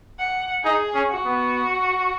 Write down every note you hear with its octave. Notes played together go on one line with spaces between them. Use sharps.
F#5
D#4 G#4
C#4
F#4
B3